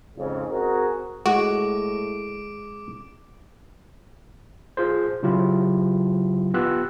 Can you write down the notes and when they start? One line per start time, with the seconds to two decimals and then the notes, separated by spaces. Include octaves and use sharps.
0.17 F2 G#2 C#3
0.50 C4 F#4 G#4 A#4
1.26 A2 G#3 F#4 D6 D7
4.77 F4 G#4 C5
5.23 C#3 F#3 E4 F4 G4
6.54 B3 F4 G4 E6 F#6